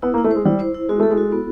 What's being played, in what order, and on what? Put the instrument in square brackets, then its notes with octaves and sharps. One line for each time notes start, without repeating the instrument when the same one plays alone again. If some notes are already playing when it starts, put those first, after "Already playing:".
[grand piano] B3 [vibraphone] E4
[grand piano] A#3
[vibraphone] E4
[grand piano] A3
[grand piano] G#3 [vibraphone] C5
[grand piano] G3 [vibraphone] E4
[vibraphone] C5
E4
[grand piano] G#3 [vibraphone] F#4
[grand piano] A3 [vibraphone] A4
[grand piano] G#3
[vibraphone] F#4
B3